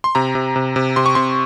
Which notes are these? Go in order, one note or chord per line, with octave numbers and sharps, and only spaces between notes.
C6
C3 A#5
C3
C3
C3
C3 C6
C#6
C3 C6